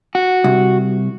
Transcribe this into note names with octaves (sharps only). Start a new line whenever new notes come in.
F#4
C2